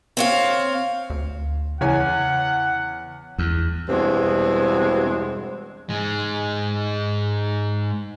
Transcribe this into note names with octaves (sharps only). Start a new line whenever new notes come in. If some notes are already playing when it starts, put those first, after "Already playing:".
C4 C#5 F5
D2
E2 C#3 C#5 F#5 G#5
E2
E2 G2 B2 G#3 C4
G#2 G#3